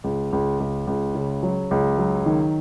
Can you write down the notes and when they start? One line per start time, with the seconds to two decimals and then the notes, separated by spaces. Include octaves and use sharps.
0.04 C#2
0.33 C#2
0.60 C#2
0.87 C#2
1.15 C#3
1.43 F#3
1.71 C#2
1.98 F#3
2.26 D#3